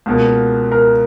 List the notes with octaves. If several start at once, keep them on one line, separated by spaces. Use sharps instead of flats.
C#2 B2 A#3
A#4